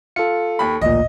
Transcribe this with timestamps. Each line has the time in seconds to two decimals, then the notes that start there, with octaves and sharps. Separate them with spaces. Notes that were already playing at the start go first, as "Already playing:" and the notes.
0.16 F4 A4 C#7
0.59 D#2 B5
0.82 A1 D2 A#2 D#5